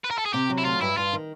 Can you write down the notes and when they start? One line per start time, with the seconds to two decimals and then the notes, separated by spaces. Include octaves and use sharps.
0.04 B4
0.11 A#4
0.18 A4
0.26 G#4
0.33 C3 G4
0.50 F#3
0.58 E4
0.65 D2 F4
0.81 G2 E4
0.97 G2 F4
1.13 D#3